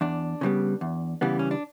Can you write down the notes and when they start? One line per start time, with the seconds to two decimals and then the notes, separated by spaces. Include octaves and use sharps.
0.01 E2 D4
0.41 C#3 E3 G3 B3
0.81 E2
1.21 C#3 E3 G3 B3
1.39 C#4
1.51 D4